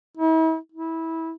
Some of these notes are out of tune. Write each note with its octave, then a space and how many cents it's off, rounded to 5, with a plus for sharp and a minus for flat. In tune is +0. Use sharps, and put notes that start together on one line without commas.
E4 -45
E4 -20